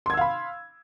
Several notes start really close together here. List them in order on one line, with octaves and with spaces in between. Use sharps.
C6 G#6 E6 F5 B5